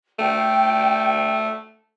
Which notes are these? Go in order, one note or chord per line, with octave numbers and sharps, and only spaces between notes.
A3 G5